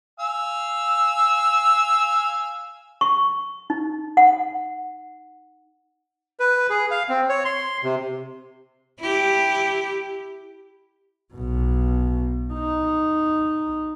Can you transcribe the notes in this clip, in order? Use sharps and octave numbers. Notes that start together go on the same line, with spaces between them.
F5 G#5 E6
C#6
D#4
F#5
B4
G#4
F5
C4
C#5
C6
C3
E4 G4
B1 B2
D#4